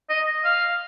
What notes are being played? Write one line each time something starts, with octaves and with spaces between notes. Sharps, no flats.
D#5
F5